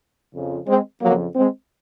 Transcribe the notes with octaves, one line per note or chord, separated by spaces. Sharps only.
F2 C#3 F3
G#3 C4
F2 C#3 F3 F#3 A#3
G#3 C4